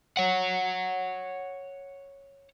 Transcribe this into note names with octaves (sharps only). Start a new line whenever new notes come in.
C#5 F#5